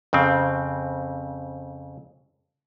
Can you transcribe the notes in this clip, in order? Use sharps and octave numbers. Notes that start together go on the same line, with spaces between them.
F2 C#3 C4